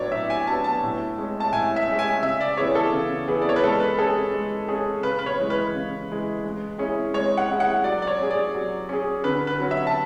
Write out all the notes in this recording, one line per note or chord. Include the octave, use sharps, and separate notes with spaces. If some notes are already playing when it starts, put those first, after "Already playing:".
Already playing: A2 F#3 B3 D4 C#5 D5
A2 E5
G#5
F#3 B3 D4 A5
A5
A2
G#3 C#4
A5
A2 G#5
E5
G#3 C#4
G#5
C#3 E5
D5
E3 B3 E4 G#4 C#5
A4
C#3
E3 B3 E4 G#4
D5
C#5
B4
G#3 A4
B4
C#4 G#4 A4
G#3
C#4 G#4
C#3 B4
B4
C#5
E3 G#3
B4
C#3
E3 G#3
G#3
C#4 E4 G#4
G#3 C#5
F#5
C#4 E4 G#4
F#5
F#3 D5
D5
C#5
C#4 G#4
D5
F#3
C#4 G#4
D3 B4
B4
F#3 C#4 F#4
E5
A5